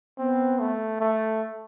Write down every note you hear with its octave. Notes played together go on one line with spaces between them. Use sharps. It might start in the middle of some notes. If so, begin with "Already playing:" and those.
B3 C4
A3
A3